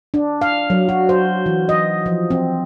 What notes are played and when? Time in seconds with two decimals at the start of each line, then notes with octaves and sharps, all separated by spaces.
0.14 D4
0.42 F5
0.70 F#3
0.89 F#4
1.09 C5
1.46 E3
1.69 D#5
2.06 F3
2.30 C4